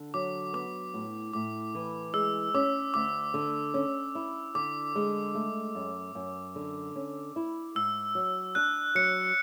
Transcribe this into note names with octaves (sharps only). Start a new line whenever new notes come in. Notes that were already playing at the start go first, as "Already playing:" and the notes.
Already playing: D3
F#3 D6
B3 D6
A2
A2 D6
E3
G#3 E6
C#4 D6
D2 D6
D3
C#4
E4
D3 D6
G#3
A3
F#2
F#2
D3
C#4
E4
G#2 E6
F#3
D4 F#6
F#3 C#7